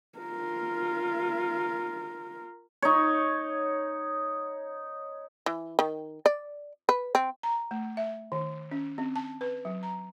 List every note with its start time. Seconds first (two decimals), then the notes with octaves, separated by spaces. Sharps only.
0.19 F4 A#4
2.82 D#4 C#5
5.46 E3
5.79 D#3
6.26 D5
6.89 B4
7.15 C4
7.43 A#5
7.71 A3
7.97 E5
8.32 D#3
8.71 C#4
8.98 C4
9.16 A5
9.41 B4
9.65 F#3
9.83 A#5